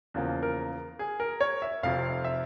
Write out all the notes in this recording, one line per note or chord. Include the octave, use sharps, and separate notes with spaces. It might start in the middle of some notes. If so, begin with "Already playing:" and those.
E2 C#3 F3 A#3
A#4
G#4
A#4
C#5
E5
F1 F2 C3 F5
E5